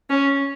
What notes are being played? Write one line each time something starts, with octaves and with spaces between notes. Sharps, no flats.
C#4